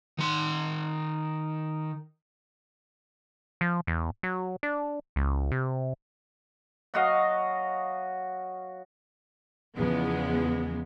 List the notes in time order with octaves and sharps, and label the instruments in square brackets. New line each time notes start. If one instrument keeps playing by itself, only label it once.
[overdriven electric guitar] D#3 C6
[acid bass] F3
E2
F#3
D4
C#2
C3
[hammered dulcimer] F#3 F#4 D#5 F5
[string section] E2 C#3 F3 G#3 B3